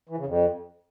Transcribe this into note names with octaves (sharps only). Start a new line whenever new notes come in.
E3
C#3
F2